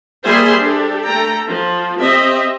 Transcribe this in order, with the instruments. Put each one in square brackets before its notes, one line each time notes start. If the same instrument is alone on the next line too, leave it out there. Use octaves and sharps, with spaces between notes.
[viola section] G3 A#3 G#4 C5 E5 C6
D4 G4 A4
A3 A4 G5 A#5
F3
C4 G4 D#5 E5